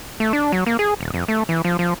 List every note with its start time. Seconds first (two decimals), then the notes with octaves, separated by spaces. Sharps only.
0.20 A3
0.33 D4
0.52 F#3
0.66 A#3
0.79 G#4
1.01 D#1
1.14 F2
1.28 A3
1.49 E3
1.64 F3
1.79 F3